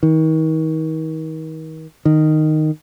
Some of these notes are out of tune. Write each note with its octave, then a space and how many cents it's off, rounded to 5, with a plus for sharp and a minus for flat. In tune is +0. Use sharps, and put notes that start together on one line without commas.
D#3 +35
D#3 -10